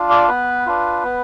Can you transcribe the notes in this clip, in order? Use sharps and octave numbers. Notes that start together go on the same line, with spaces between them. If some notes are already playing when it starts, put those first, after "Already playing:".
Already playing: D4 F4
D5
B3 B4
D4 F4
B3